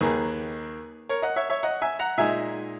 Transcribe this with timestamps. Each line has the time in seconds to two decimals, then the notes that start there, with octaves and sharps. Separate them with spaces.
0.01 D#2 D#3 A#3 G#4 B4
1.09 A#4 C#5
1.22 D#5 F#5
1.36 C#5 E5
1.50 C#5 E5
1.63 D#5 F#5
1.82 E5 G#5
1.99 F#5 A#5
2.18 A#2 G#3 D#4 E5 G#5